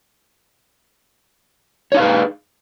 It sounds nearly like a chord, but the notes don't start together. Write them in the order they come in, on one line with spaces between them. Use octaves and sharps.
C#5 D#4 F5 B4 G#4